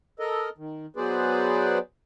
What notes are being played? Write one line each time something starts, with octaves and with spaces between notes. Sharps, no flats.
A4 A#4 D#5
D#3
F#3 B3 G#4 B4 C5 D5